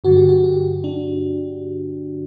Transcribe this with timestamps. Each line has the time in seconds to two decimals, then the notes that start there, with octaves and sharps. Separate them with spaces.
0.04 G2 D3 F#3 F#4
0.17 G4
0.29 F#4
0.44 G4
0.84 D4